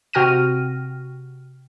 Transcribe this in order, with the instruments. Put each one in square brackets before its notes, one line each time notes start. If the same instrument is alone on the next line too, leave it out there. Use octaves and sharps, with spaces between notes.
[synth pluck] C3 F#4 G5 F6 A#6 D#7